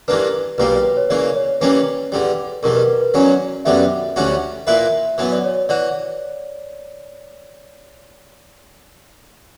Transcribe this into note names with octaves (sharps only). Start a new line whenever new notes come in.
G2 E3 A#3 D4 B4
B1 A#2 G3 A#3 B4
B4
B4
C#5
C#3 E3 A#3 D5
C#5
E3 G3 A#3 C#4 B4
E2 D3 G3
E2 B2 G3 A#4
B4
B4
E2 C#3 F#3 C#4 D5
F#2 D3 G3 B3 E5
D2 D3 G3 C#4 F#4
A#2 A#3 E4 B4 E5
F#2 E3 B3
D5
C#5
E3 F#4 D5